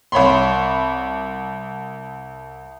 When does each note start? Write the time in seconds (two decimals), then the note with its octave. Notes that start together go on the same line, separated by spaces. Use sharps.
0.12 C2 C#5 B5 C6